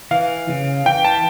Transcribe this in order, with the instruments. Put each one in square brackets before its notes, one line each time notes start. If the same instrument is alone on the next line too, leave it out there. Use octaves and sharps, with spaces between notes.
[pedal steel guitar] E3 [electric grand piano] F5
[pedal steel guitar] C#3
[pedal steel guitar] E3 [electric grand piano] G5
[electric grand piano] A5